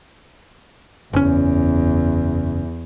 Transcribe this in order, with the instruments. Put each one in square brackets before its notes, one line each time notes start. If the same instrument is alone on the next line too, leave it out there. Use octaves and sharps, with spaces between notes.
[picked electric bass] F#1 C#4 [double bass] E2